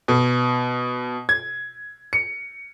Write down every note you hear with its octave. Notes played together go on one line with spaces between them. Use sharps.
B2
G#6
C#7